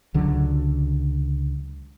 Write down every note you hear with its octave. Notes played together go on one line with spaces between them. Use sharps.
C#2 D3 F#3